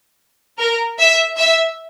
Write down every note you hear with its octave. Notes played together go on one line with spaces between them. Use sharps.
A#4
E5
E5